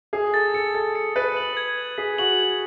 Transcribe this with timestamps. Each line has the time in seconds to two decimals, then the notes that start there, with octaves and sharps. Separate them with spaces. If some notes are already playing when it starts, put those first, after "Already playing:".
0.13 G#4 D#6
0.34 A4 A6
0.54 A4 C#7
0.75 A4 A6
0.95 C#7
1.16 B4 A6
1.37 F#7
1.57 G#6
1.78 F#7
1.98 G#4 B6
2.18 F#4 F#7
2.39 G#6